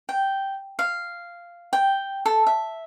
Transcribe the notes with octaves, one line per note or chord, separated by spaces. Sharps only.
G5
F5
G5
A4
E5